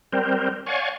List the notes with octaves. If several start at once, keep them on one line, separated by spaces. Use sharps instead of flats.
G3 C4 A#4 C5
C#5 D5 F5 F#5 G#5 C#6